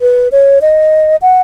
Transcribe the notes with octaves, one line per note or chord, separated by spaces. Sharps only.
B4
C#5
D#5
F#5